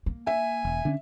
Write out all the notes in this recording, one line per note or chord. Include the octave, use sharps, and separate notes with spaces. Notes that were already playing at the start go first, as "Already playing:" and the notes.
A#3
E5 G#5
E1
D3 B3 C#4